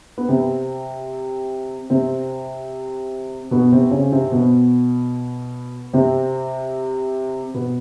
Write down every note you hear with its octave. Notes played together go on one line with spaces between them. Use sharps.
B3
C3 C4
C3 C4
B2 B3
C3 C4
C#3 C#4
C3 C4
B2 B3
C3 C4
B2 B3